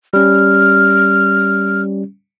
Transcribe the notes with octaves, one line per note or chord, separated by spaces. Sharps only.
G3 C#4 F6